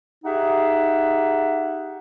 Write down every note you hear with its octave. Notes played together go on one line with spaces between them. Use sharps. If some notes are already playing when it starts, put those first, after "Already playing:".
D#4 G4 G#4 E5 F#5